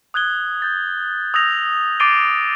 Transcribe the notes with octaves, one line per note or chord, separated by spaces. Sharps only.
D#6 F#6 G#6 G7
G6 A6
D#6 E6 G6 A#6 F7
D6 A6 C7 D7 D#7 G7